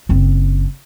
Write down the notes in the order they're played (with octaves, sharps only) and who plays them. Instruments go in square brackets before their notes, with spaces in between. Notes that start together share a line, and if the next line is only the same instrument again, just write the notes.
[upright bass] F#1 C4